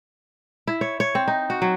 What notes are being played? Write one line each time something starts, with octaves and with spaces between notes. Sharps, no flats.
E4
C#5
C#5
C4
D#4
F#4
F#3